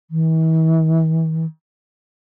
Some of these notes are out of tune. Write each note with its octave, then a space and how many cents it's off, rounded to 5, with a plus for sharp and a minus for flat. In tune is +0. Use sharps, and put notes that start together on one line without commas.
E3 -40